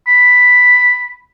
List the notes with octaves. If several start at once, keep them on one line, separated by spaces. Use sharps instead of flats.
B5